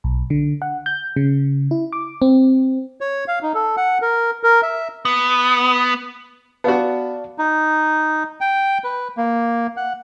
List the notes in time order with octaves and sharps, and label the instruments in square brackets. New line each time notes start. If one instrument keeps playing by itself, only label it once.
[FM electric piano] B1
D3
F#5
G6
C#3
E4
D6
C4
[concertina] C#5
F5
D#4
A4
F#5
A#4
A#4
E5
[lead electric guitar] B3
[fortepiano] B3 F#4 [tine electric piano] D5 F5 A5
[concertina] D#4
G5
B4
A#3
F#5